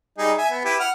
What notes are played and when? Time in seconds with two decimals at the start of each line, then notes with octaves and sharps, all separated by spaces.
0.18 G3 D#4 G#4
0.38 E5 G#5
0.51 B3
0.64 E4 G4 B4
0.80 F#5 F6